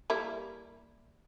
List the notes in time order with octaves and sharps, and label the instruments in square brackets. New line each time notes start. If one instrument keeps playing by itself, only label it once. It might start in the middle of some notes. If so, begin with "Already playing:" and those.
[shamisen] G3 A#3 E4